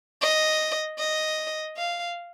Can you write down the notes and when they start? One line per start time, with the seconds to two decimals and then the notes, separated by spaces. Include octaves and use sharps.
0.22 D#5
0.99 D#5
1.77 F5